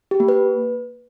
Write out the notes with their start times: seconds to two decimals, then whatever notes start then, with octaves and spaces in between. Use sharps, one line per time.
0.11 G4
0.20 A#3
0.28 B4